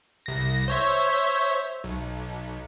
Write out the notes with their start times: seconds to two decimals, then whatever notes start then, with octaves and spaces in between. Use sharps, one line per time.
0.26 C2 A#6
0.68 C5 C#5 E5
1.84 B1